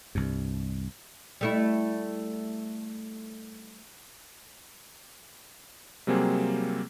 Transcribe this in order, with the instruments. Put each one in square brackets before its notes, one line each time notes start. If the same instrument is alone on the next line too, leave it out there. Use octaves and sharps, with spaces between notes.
[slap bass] C2 G2
[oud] G3 A3 E4
[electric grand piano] C3 F#3 G3 A#3 C4 G#4